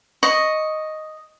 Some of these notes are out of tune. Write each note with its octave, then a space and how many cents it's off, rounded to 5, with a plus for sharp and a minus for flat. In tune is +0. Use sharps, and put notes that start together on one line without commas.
D#5 +0 C#6 +0